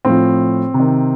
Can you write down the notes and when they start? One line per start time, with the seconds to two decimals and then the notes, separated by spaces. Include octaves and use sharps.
0.05 A2 F3 C4
0.74 C3
0.80 D#3